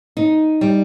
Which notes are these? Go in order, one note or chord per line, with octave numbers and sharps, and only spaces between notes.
D#4
G3